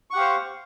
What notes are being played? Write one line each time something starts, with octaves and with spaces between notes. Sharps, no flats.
G4 C5 F5 F#5 C#6